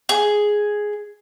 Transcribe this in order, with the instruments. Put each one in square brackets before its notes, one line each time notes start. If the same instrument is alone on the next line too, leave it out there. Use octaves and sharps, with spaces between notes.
[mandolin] G#4